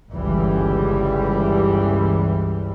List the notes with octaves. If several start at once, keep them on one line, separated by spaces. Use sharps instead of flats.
G1 C#2 E3 G3